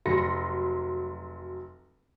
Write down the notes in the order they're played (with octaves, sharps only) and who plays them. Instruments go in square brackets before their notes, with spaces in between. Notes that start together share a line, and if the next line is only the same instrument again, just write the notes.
[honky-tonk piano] F1 F#3 B5 C6 A#6 C#7